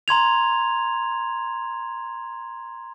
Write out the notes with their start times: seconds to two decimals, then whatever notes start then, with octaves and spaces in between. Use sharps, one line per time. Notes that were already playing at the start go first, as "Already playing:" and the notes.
0.08 A#5 C6 G#6 F7